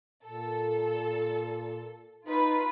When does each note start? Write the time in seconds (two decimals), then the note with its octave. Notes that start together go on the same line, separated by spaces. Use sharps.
0.24 A#2 A4
2.27 D#4 F4 B4